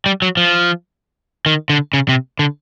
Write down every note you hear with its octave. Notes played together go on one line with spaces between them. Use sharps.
G3
F#3
F3
D#3
D3
C#3
C3
D3